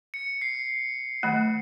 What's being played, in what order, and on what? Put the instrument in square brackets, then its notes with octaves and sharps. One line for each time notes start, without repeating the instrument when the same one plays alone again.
[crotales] C#7
C7
[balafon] D#3 F#3 A3